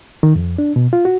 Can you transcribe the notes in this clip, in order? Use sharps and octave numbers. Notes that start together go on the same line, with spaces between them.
D#3
F2
D4
B2
F4
F#4